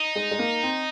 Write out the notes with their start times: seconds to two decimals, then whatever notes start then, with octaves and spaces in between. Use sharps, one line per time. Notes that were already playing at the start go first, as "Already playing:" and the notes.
Already playing: D#4
0.15 G#3
0.31 G#3
0.39 A#3
0.63 C4